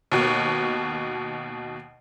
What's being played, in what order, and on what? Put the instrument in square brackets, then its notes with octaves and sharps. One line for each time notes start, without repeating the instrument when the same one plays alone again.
[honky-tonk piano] D#2 B2